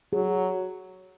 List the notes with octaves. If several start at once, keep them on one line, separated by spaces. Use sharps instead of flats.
F#3 G#4